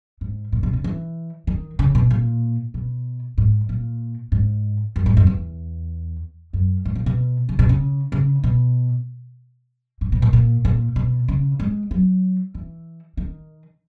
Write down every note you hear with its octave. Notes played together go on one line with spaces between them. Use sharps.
G#2
A#2
B2
C#3
E3
D#3
C#3
B2
A#2
B2
G#2
A#2
G#2
F#2
G#2
F#2
E2
F#2
G#2
A#2
B2
C#3
B2
C#3
C#3
B2
G#2
B2
A#2
A#2
A#2
B2
C#3
G#3
F#3
E3
D#3